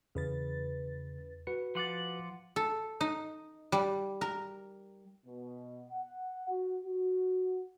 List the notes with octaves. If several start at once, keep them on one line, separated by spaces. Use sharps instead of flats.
E2 C#3 B4 A6
F#4 B4 C#7
F3 F#5 C6 D6 A6
A4
D#4
G3
A#4
B2
F#5
F#4
F#4